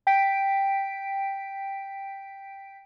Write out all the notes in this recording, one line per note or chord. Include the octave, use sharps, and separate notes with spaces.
G5 B6 D7